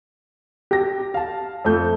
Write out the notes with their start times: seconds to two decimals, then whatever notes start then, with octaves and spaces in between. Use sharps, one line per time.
0.71 G4 A#6
1.14 F5 A5
1.65 F2 A3 G6